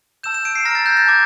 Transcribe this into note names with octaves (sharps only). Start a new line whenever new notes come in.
A5 E6 G6 E7
E7
D7
C7
A#5 F6 A#6
A6
G6
A6
A5 D6 G6